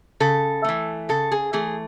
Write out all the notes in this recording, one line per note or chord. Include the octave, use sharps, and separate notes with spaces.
C#3 A4
E3 A3
C#3 A4
G#4
E3 A3 G#4